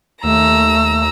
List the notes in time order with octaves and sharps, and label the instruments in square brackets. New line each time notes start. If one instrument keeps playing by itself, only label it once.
[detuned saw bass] D#2 [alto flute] A3 [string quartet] A#5 E6